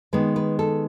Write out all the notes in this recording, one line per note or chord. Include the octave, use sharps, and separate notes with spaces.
D#3 G#3 B3 B4
B4
A4